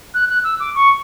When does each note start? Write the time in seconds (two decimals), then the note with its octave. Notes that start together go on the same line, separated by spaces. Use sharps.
0.14 F#6
0.29 F#6
0.44 E6
0.60 D6
0.75 C#6